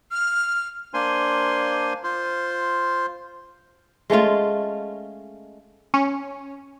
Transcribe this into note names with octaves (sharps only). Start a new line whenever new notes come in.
F6
A#3 D4 C5 G#5 C6
F4 C5
G#3 A3 C#4 F4
C#4